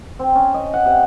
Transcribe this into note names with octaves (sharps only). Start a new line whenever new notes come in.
C4
C#4
D#5
F#5
C3